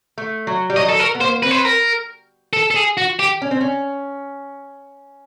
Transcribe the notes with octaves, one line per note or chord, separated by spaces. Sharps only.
A3
F#3
G3
F#3 D#5
A4
A#4
B3
A#3 C5
C4 B4
C5
B4
A#4
A4
A4
G#4
F#4
G4
C#4
C4
C#4